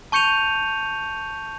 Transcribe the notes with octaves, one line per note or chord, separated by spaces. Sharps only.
A5 C#6 G6 C#7 D#7 F7